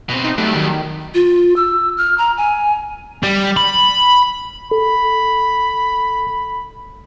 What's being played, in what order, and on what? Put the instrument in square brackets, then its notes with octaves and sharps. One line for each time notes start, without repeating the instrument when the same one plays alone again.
[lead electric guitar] B2 C4
[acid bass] D#4
[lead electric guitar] F#3 G3 [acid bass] A3
[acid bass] D#3
[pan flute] F4
E6
F6
A#5
G#5
[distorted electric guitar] G3
B5
[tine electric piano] A4 [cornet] B5